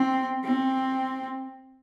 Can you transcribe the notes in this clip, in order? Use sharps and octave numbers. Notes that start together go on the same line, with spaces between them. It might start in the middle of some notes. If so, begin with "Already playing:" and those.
Already playing: C4
C4